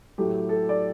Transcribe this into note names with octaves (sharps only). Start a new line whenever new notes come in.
A2 F#3 A3 G4
A4
D5